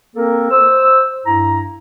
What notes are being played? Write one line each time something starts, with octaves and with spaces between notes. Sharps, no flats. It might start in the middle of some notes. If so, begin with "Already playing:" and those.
A#3 C4 A4 A#4
C5 E6
G2 E4 A#5